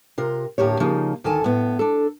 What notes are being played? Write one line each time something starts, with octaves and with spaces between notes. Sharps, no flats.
C3 F4 A#4
D2 A2 A#3 G4 C#5
C#3 F3 A#3 D#4
D2 D#3 A4 G#5 A5
A2 B3
D4 A4